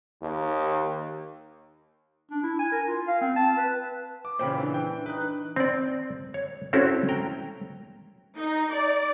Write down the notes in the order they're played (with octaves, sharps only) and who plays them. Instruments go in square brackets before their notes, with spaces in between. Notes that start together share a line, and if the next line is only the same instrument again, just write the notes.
[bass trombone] D#2
[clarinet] D4
E4
G#5
A#4
F4
F5
C4
A5
B4
[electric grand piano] D6
[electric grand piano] A#2 C#3 [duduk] E3 [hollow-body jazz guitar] C5 G5 B5
[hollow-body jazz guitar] D4
[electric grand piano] G5
[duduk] D#4 [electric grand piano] B4 F#6
[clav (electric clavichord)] C4 D5
C#5
C4 C#4 E4 F#4 A4
G5 A#5
[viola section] D#4
D5